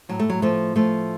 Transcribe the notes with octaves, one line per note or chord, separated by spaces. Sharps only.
A2 F#3
A3
F#3
F3 A3
F3 A3